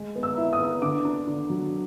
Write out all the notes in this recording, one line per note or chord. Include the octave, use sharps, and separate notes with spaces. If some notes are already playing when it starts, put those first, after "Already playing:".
Already playing: G#3
B3
E6
E4
D#6
B3
D3 D6
D4
D3
F#3